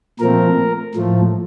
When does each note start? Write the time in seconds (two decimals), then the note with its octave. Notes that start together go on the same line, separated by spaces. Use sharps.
0.20 A#2 F3 A3 C4 A#4
0.95 A2 F3 A3